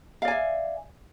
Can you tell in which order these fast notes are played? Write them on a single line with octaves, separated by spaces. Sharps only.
F5 D5 G#5 E5